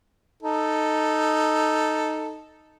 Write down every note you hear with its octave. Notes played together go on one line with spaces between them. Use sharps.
D#4 A4